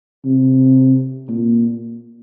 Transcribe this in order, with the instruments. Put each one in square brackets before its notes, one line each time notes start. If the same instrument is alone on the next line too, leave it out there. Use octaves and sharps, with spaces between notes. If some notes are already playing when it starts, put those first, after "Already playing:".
[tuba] C3
A#2